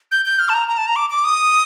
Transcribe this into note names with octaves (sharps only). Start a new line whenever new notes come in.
G6
G6
F6
A5
A#5
A#5
A5
A#5
D6
D6
D#6